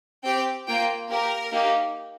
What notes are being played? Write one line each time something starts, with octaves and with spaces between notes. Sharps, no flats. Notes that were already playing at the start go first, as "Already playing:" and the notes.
C4 G4 G5
A#3 F4 G5
A#3 G4 A#4
A#3 D#4 G4